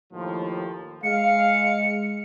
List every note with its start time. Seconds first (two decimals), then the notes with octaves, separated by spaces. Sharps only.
0.13 D#2 A2 F3
1.04 G#3 F5 C#7